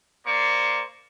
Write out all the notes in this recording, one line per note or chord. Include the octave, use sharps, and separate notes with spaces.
A#3 C5 D5 C#6